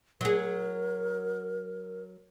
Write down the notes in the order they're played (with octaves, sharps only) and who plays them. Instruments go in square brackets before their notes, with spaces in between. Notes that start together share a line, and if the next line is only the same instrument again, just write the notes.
[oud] F#3 G#4 [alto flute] A#4